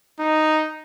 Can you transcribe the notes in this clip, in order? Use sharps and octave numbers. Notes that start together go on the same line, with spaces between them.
D#4